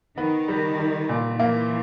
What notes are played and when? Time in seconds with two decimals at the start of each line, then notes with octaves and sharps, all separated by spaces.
0.17 D#3 B3
0.48 G3
0.78 G3
1.09 A#2
1.40 E3 A#3